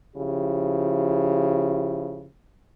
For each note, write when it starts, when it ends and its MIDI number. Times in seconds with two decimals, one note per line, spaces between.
0.16 2.27 49
0.16 2.27 53
0.16 2.27 64
0.16 2.27 67